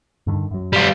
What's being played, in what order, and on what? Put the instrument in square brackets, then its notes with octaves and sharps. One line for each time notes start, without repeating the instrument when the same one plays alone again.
[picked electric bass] G2 D3 D#3
F#2 F#3
[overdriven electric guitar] G3 F4